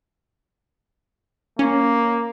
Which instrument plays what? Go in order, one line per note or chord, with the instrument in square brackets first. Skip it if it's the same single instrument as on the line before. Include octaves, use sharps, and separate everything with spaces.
[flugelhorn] A#3 [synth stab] C#4